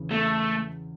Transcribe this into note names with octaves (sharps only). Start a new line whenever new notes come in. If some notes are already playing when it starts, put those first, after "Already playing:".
Already playing: E2 C#3 E3
A3